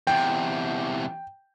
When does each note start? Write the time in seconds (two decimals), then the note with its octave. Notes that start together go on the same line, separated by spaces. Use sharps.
0.07 E2 C3 G5